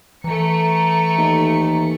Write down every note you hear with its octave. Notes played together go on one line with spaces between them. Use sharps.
E3 A3 A#5 C#7
D#2